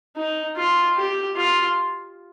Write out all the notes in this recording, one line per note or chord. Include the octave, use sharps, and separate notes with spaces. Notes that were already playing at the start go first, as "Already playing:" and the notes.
D#4
F4
G4
F4